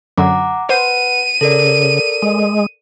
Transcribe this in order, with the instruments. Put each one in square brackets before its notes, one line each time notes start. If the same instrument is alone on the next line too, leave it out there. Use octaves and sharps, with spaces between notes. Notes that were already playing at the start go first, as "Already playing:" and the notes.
[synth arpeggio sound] F#2 D3 F#3 [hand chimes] F#5 A#5 D6
[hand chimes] B4 F#5 [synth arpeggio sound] C5 [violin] D#7
[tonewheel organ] C#3 [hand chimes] A4 A#4 D5
[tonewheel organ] G#3